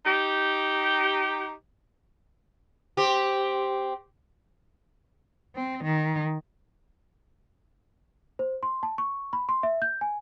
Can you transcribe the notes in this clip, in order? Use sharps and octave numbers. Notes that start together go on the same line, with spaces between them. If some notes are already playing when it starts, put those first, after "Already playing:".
D#4 G4
C4 G4
C4
D#3
C5
C6
A5
C#6
B5
C6
E5
G6
G#5